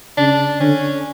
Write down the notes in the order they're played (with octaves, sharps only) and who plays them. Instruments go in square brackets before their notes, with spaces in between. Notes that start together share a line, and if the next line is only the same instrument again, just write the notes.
[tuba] C#3 [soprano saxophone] D4
[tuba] D3 [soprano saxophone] C#4